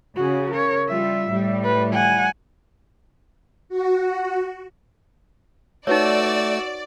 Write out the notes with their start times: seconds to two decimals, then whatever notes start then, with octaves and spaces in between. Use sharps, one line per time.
0.16 C#3 F#4 G#4
0.51 A#4 C#5
0.89 G3 F4 E5
1.30 A2 G3
1.64 B4
1.93 F#5 G#5
3.69 F#4
5.87 A3 D#4 F#4 B4 C#5 D5 E6